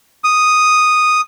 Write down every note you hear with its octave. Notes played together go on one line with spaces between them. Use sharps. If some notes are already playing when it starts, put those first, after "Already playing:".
D#6